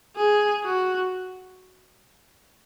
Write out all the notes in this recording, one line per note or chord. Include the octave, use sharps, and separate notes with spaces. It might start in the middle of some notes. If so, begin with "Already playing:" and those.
G#4
F#4